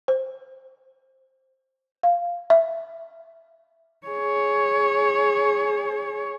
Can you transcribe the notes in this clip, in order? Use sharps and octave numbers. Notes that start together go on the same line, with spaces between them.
C5
F5
E5
G#4 C#5